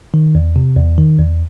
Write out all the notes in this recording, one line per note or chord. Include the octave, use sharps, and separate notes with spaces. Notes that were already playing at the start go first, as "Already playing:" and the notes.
D#3
E2
C3
E2
D#3
E2